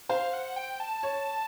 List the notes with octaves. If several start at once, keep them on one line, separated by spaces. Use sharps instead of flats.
C5 F5
F#5
G5
A5
C#5